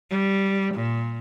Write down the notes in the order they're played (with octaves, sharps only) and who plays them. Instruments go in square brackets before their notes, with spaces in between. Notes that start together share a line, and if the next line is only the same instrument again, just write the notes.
[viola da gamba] G3
A#2